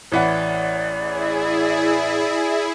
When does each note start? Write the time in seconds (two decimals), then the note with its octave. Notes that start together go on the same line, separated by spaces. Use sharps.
0.12 A1 E3 D5 F#5
0.96 E4 G#4